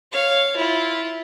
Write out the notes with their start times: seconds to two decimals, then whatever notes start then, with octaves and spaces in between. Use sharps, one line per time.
0.12 C#5 F5
0.56 E4 F4